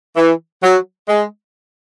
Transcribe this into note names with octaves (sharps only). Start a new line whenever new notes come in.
E3
F#3
G#3